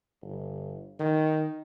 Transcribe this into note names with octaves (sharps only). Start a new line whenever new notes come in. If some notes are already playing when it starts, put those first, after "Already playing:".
G1
D#3